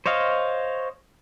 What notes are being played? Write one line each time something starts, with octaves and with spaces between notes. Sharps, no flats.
C5 C#5 D#5 F5